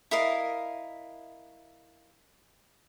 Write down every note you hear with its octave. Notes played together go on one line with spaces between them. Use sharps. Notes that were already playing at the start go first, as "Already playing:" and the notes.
E4 A#4 D#5 F5